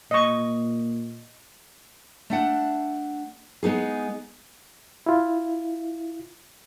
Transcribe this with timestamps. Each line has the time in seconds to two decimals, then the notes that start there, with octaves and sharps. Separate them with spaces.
0.11 A#2 D#5 C#6
2.30 A3 D4 F#5
3.63 G#3 B3 D#4 G#4
5.06 E4 F4